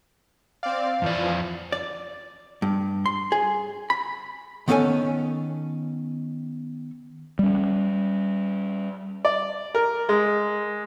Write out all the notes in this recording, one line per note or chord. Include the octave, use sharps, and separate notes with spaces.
C4 D5 F5
F2 E3 F3 D5
D5
G2
C6
G#4
B5
D#3 B3 C#4 A4 G#5
G3 C#4
D5
A#4
G#3